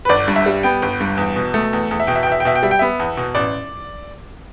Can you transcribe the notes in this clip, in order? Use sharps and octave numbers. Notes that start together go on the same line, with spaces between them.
B4
G1 D5
G2
E5
G3
B3 G5
G1
G2
E2
B2
A3
E2
E2
E5
B2 G5
E5
G5
E2
E5
G5
B2 E5
G5
G3 E5
G5
B3 E5
E2
B2
A1 D5